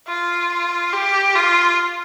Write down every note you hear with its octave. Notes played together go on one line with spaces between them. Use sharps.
F4
G4
F4